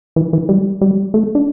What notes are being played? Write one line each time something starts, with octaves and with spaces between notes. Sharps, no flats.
E3
E3
G3
G3
A3
D4